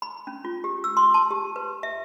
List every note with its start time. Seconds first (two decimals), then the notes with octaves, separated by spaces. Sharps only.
0.02 B5
0.27 C#4
0.45 F4
0.64 G4
0.84 E6
0.97 C6
1.14 A5
1.31 G4
1.56 B4
1.83 E5